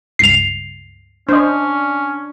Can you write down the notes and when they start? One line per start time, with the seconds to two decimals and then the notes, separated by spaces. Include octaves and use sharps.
0.19 C#2 G2 C7 F7
1.29 C#4 D4 C5 D#5